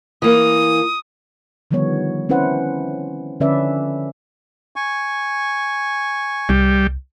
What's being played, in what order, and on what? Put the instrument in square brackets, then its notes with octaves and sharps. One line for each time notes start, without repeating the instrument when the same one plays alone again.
[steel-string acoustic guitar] E3 A#3 [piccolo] D#6
[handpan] D3 D#3 F3 G3 B3 C#5
C4 C#4 E4 B4 C5 F#5
D3 F3 C#4 B4 D5 E5
[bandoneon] G#5 C#6
[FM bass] C2 [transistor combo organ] G3